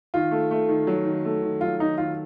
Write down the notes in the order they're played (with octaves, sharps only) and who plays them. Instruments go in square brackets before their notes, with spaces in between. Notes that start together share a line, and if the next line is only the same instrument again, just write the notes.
[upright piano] D#3 [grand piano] F4
[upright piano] A3
A3
D#3
F#3
D#3
A3
D#3
[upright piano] F#3 [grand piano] F4
[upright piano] D#3 [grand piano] D#4
[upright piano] D#3 [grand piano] F4